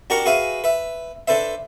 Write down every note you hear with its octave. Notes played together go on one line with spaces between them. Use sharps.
D4 F#4 G4 A#4 A#5 C#6
F#4 G#4 B4 E5 F5 G#5
B4 E5
D4 A4 B4 C5 E5